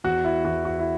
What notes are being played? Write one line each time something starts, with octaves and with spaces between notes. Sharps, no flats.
E2 F#4
E4
E2 F#4
F#4
E4